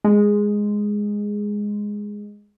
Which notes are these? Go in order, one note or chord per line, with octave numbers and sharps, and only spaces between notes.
G#3